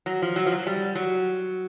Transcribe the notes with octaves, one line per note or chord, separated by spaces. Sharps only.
F#3
F3
F#3
F3
F#3
G3
F#3